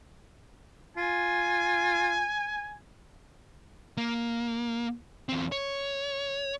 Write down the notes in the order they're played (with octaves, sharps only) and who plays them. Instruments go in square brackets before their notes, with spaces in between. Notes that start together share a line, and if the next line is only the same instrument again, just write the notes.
[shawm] F4 [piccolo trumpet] G#5
[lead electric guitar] A#3
E2 C4
C#5